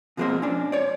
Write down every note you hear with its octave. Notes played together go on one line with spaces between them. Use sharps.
B2 F3 G#3 A#3 C4 A#4
C#4 D4
C#5 D5